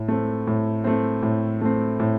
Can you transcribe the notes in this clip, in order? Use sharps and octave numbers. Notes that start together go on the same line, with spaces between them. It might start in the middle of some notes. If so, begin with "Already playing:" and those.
Already playing: A2
A3 C4
A2
A3 C4
A2
A3 C4
A2